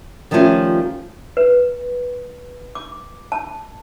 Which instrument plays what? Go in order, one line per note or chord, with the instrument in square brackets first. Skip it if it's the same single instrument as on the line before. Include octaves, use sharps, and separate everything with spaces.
[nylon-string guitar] D#3 F3 G3 A3 C#4 F4
[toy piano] B4
D6
A5